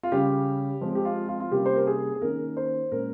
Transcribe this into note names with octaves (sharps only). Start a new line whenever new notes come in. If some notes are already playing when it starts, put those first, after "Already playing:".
F4
C#3 G3 C#4 G4
F3 G#3 C4
G4
F4
F4
F4
C3 G3 A#3 C#4 G4
C5
A#4
G#4
G#4
D#3 A#3 C#4 A#4
C5
A#2 G#3 C#4 A#4